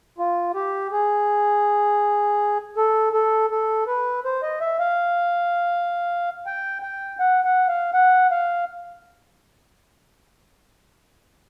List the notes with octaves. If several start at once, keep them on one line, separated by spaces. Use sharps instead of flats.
F4
G4
G#4
A4
A4
A4
B4
C5
D#5
E5
F5
G5
G5
F#5
F#5
F5
F#5
F5